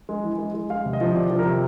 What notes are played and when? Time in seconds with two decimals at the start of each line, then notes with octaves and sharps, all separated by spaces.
0.09 G#3
0.24 E3
0.39 G#3
0.54 G#3
0.70 G#3 F5
0.86 C3
0.93 D#5
1.01 F3
1.15 C3 D5
1.30 F3
1.39 A#4
1.46 C3